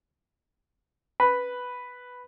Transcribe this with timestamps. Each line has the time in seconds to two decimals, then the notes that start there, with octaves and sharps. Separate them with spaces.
1.20 B4